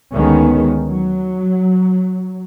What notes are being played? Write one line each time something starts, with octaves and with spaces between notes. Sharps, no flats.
D2 D#3 G#3 B3 C#4
F#3